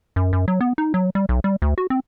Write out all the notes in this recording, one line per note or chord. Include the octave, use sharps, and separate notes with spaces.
F#2
F#2
F#3
B3
D#4
F#3
G3
B1
G3
D2
F#4
C4